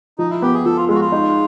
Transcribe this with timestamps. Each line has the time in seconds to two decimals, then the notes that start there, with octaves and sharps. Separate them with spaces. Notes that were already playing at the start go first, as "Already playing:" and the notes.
0.18 F3 D#4
0.30 E4
0.42 B3 G4
0.53 G#4
0.65 F3 A4
0.77 F4
0.89 G#3 F4
0.95 F#4
1.01 F4
1.12 D#4